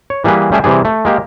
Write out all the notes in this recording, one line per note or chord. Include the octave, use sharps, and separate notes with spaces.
C#5
E3 G3 A#3 G#4 B4
G3 A3 C#4 G#4 E5 G5
C3 E3 G3 G#4
A3
G#3 A#3 G4